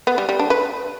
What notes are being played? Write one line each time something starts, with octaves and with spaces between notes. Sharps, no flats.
B3
G3
G3
D4
B4